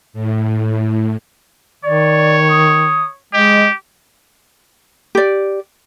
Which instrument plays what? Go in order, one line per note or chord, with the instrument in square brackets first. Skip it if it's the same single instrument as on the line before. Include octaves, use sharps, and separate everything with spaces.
[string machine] A2
[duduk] D#3 [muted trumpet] C#5 [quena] D5
[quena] D#6
[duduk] G#3 [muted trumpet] G4 [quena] D#5
[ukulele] G4 D5